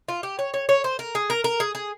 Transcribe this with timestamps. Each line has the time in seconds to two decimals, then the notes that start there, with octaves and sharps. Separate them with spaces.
0.08 F4
0.23 G4
0.39 C#5
0.54 C#5
0.69 C#5
0.84 C5
0.99 A#4
1.15 G#4
1.30 A#4
1.44 A#4
1.60 G#4
1.75 G#4